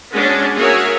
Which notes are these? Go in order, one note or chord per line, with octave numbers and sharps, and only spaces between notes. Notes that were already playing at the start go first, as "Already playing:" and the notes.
G#3 C#4 D4 F#4
F#4 G#4 A#4 C#5 E5 F5